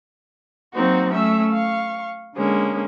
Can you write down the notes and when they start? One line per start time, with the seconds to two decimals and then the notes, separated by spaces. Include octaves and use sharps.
0.74 F#3 A#3 C4 D#4 F#4
1.12 A3 C#4 E5 E6
1.53 F5 C#6
2.35 D3 G#3 A#3 C#4